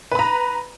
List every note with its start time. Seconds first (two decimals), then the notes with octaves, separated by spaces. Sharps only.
0.11 B4
0.15 B5
0.19 A#5